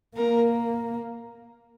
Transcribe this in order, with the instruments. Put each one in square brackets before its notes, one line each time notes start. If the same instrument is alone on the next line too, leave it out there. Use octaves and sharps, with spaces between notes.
[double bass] A#3 [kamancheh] A#4